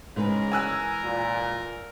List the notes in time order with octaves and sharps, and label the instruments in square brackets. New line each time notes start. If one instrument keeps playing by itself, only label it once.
[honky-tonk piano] G#2 [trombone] C#3 [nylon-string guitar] E3 G#3 B4 [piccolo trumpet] A#4
[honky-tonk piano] G#5 E6 F#6
[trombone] A#2